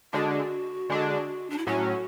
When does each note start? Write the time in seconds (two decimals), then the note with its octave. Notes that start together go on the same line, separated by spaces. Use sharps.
0.13 D3 G#3 D4 F#4
0.90 D3 G#3 D4
1.50 D4
1.58 E4
1.66 A2 F#3 C#4 F#4